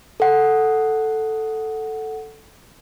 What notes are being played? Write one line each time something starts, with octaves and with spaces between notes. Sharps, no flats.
A4 F#5